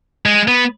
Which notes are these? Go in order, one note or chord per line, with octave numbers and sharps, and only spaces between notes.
G#3
B3